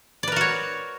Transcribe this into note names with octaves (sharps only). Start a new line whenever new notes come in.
F#4 A#4 B4 C#5 D5